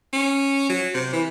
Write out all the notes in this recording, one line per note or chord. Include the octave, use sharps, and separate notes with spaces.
C#4
F#3
C3
E3